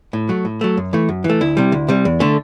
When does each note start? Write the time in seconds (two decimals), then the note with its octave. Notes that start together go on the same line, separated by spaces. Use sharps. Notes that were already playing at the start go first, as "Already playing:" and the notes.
0.13 A2
0.29 F#3 A3
0.45 A2
0.61 F#3 A3
0.77 F#2
0.93 E3 A3
1.09 F#2
1.24 E3
1.30 A3
1.41 D2 E4
1.57 C3 G3
1.72 D2
1.88 C3 G3
2.05 E2
2.20 D3 A3